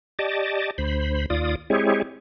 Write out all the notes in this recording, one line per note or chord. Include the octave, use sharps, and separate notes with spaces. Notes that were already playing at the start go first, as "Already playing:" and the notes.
G4 D5 D#5 A5
D2 C5 B5
D#2 F4 D5 D#6
G#3 C4 E4 G4 G#4 C#5